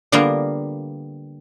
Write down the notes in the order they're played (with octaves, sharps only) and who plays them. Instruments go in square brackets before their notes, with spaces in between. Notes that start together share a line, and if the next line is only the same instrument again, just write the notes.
[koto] D3 G3 A#3 B3 F4 A#4